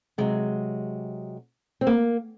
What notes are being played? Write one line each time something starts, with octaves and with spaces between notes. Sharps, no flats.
C3 F#3 G#3
C4
A#3